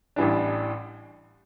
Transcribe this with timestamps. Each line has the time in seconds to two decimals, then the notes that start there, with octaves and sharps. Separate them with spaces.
0.16 A1 A2 E3 G3 D4